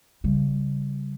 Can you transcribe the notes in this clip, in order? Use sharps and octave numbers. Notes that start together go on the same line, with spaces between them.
C#3 G3